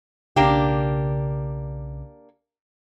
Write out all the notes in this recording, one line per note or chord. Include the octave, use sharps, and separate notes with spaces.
B1 C#3 A#3 D4 G4